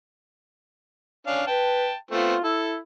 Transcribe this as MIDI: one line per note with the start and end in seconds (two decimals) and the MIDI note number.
1.27 1.43 61
1.27 1.43 62
1.27 1.43 77
1.47 1.90 71
1.47 1.95 79
1.47 1.95 81
2.11 2.34 57
2.11 2.34 59
2.11 2.34 60
2.11 2.44 65
2.44 2.78 64
2.44 2.76 69